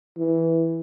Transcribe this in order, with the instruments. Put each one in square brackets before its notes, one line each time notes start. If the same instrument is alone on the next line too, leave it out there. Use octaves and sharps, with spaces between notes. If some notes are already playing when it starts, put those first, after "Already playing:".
[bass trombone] E3